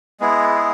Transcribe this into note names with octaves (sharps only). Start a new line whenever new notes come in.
G#3 B3 E4 G#4
G#4